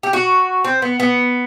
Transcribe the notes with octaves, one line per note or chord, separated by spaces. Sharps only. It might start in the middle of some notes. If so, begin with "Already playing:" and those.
G4
F#4
C4
B3
B3